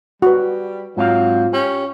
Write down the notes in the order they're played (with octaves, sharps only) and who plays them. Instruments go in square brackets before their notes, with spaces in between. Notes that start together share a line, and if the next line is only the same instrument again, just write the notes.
[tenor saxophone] G3 [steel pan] F#4 B4
[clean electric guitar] G#2 C4 F5 [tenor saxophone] F#3 [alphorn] F4
[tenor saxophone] C#4 [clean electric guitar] G4